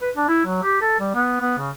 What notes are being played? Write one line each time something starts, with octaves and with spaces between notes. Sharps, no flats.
B4
D4
E4
F#3
G4
A4
G3
B3
B3
C#3